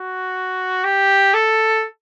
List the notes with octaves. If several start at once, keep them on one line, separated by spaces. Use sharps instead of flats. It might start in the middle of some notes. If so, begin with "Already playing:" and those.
Already playing: F#4
G4
A4